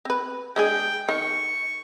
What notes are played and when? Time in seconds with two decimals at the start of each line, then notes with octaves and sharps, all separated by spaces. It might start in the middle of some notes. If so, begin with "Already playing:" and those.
0.05 C4 B4
0.56 G#3 D4 G#4 G5
1.09 D#3 C#6